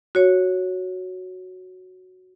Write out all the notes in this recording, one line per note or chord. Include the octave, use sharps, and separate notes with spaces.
F#4 C#5